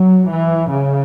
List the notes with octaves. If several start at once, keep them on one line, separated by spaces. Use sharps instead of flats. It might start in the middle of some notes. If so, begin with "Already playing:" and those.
Already playing: F#3
E3
C#3